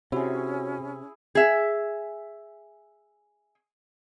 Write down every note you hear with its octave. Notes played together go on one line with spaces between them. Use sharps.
C3 C#4 E4 F#4 G#4 C#5
G#4 E5